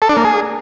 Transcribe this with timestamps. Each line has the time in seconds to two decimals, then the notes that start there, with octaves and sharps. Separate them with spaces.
0.02 A4
0.09 D4
0.17 A#3
0.24 G#4